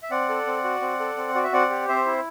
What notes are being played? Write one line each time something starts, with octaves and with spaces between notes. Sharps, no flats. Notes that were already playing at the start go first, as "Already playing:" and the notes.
E5
C4 D5 F#5
A4
C4
F#4
C4
A4
C4
F#4 D5
E5
C4 D5 F#5
G4
C4 C5 E5
E4